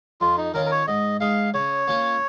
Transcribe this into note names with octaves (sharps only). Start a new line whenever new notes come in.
F2 F4
D#4
D#3 C#4 F4 A#4
A#4
C#5
G#2 D#5
G#3 D#4 F5
C#3 C#5
A#3 C#4 F4